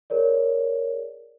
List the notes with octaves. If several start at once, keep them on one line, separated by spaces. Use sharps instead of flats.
G#4 A#4 C#5 D5